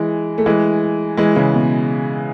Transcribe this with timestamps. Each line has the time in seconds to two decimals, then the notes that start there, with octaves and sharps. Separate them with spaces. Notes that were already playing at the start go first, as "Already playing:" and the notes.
Already playing: E3 G#3
0.38 A3
0.46 E3 G#3
1.17 E3 G#3
1.36 C#3 E3
1.54 B2